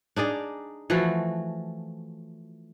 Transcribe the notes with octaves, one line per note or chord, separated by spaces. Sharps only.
D4 D#4 G#4 D5
E3 F3 A3 F#4